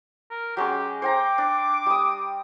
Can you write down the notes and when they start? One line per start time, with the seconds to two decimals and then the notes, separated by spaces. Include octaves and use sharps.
0.31 A#4
0.57 F#3 G#3 C#4 G4
1.02 C5 G5 A#5 D6
1.38 D4
1.86 G3 D#6